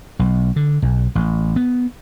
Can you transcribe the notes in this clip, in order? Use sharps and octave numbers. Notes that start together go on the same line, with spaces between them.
B1
D3
B1
A1
B3